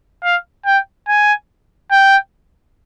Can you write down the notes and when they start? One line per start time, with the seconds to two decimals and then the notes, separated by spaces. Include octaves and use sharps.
0.24 F5
0.66 G5
1.08 G#5
1.91 G5